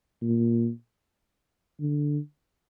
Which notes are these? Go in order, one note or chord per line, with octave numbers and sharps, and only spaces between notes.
A#2
D3